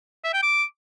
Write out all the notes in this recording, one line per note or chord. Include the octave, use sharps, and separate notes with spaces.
E5
G5
D6